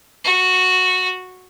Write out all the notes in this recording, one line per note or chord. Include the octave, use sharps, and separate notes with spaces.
F#4